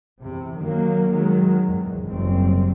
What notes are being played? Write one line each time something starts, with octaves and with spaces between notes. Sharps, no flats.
E2 C3
D#3 F#3 A#3
D#3 F#3 G#3
E2 G#2
F#1 G3 C4